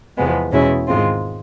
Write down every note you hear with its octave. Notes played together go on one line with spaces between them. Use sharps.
E2 C3 F3 G#3 B3
E2 B2 G#3 C#4 E4
G#2 D#3 G#3 C4 F4